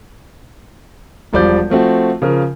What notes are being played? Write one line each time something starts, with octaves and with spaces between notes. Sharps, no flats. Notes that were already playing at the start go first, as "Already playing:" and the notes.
E1 F3 G3 D5 D6 G6
F3 A3 C4 F#4
C#3 F3 A#4